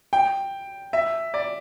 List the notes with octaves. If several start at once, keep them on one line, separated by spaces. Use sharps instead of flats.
G5
E5
D5